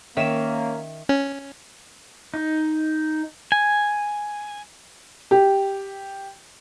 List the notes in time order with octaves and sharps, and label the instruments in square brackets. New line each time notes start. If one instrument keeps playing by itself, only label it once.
[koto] D#3 [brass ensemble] A#3 [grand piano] C#4 [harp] E5 E7
[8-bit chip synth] C#4
[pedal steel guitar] D#4
G#5
[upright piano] G4